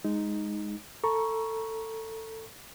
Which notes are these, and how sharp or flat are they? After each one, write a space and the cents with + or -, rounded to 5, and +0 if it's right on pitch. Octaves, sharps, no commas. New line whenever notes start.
G#3 +0 D#4 +0
A4 +20 A#5 +30 C#6 +0